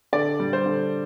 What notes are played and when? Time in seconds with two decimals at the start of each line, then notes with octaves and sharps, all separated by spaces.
0.13 D3 D5
0.40 G3
0.53 C5
0.66 D3